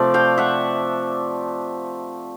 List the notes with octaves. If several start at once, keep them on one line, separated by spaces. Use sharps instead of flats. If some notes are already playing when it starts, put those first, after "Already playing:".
Already playing: C3 F3 A3 D5
F5 G5
E5 F#5